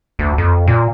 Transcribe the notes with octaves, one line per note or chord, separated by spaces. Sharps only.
D2
F2
A#2